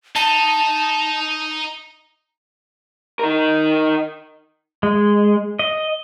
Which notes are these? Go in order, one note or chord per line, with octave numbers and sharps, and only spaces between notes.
D#4 A5
D#4 A#4
G#3
D#5